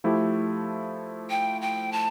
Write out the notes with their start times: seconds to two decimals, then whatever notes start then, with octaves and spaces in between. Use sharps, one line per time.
0.04 F3 A3 E4 G4
1.30 G5
1.62 G5
1.92 A5